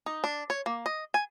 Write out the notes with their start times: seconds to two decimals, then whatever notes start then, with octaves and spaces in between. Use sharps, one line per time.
0.06 D#4
0.24 D4
0.50 C#5
0.66 A#3
0.86 D#5
1.14 G#5